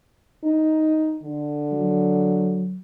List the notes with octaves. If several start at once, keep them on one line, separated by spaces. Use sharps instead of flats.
D#4
D3
F#3